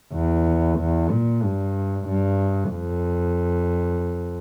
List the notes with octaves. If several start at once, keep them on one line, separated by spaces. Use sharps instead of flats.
E2
E2
A#2
G2
G2
F2